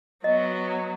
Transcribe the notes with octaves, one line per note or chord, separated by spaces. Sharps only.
F#3 B3 D#5